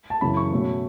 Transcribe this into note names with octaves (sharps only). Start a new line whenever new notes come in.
A5
F#2 C#3 E3 B5
C#6
B2 A3 C#4